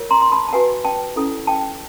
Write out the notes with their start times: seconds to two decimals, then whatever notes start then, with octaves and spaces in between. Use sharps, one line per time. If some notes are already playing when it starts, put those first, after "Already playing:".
Already playing: F4 A#4 C#5
0.10 A#5 C6
0.22 C6
0.32 A5 B5
0.48 A5
0.53 F#4 B4 F#5 G#5
0.85 G5 A5
1.16 C#4 E4 A4
1.47 G5 A5